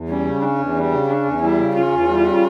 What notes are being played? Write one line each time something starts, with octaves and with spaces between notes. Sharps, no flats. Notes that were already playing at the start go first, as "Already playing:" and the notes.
Already playing: E2
G3 C#4
C#3
C#4 D4
E2
G3
C#3
C#4 D4
E2
G3 E4
C#3
C#4 F4
E2
G3
C#3